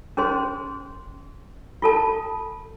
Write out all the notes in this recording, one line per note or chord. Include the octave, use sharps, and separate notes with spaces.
C#4 G#4 C5 C6
F4 A4 A5